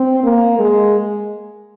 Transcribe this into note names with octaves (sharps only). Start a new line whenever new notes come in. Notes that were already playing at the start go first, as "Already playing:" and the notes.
Already playing: C4
A#3
G#3